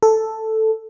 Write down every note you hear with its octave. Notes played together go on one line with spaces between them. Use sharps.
A4